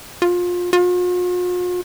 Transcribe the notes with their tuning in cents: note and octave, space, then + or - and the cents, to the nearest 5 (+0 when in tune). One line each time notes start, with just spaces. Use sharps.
F4 +25
F4 +45